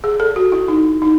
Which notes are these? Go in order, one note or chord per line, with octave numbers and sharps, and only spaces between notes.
G#4
A4
F#4
E4
D#4
D#4